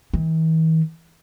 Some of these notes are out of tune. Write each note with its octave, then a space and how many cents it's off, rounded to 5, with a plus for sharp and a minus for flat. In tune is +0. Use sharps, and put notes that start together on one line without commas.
E3 -45